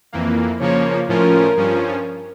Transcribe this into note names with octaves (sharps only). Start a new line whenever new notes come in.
F2 E3 A#3
C#3 F3 A#3 C#5
A2 F3 C#4 F4 A#4
G2 F3 C#4